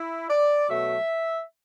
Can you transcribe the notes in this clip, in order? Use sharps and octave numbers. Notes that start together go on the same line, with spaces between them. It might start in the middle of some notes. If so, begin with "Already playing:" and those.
Already playing: E4
D5
B2 F#3 A3 E5